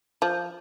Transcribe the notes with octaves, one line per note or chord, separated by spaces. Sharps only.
F3